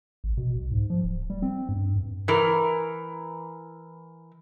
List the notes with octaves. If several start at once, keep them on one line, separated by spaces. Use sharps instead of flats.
A1
B2
B1
G#2
F3
D1
G3
C4
G2
G2
E3 A#4